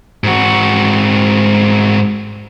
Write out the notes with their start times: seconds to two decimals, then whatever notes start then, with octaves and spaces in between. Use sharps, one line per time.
0.24 G#2 F#4